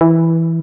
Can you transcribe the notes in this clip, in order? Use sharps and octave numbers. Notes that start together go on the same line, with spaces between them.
E3